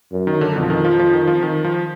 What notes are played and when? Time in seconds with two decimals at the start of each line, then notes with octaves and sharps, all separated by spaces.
0.12 F#2
0.27 D#3
0.41 D3
0.55 F2 B2
0.63 F3
0.70 D#3
0.85 F3
0.99 F3
1.13 D#3
1.28 F3
1.43 D#3
1.64 F3